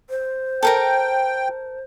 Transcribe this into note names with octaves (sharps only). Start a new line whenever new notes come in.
C5
A4 A#4 G5 A#5